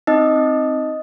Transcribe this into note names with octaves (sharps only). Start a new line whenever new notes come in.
C4 D#4 D#5
C4